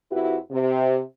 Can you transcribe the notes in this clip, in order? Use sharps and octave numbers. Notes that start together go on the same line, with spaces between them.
F2 E4 F#4 G4 B4
C3